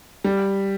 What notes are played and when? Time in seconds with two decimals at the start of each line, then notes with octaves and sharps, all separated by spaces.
0.24 G3